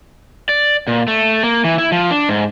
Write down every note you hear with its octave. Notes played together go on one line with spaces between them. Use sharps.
D5
A#2
A3
A#3
E3
E4
F3
D4
G#2